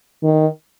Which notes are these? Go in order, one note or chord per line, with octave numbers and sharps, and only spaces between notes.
D#3